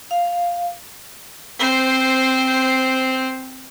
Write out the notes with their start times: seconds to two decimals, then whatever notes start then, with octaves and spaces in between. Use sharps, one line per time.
0.11 F5
1.59 C4 C5